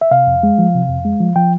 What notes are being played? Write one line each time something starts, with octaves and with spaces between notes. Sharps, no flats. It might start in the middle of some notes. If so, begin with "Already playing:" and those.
E5
C3 F5
F2
G#3
F3
C3
F2
G#3
F3
F3 G5